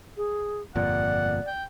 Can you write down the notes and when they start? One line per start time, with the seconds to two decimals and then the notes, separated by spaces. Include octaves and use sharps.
0.17 G#4
0.76 G1 F2 A#2 D5 F#5
1.47 G5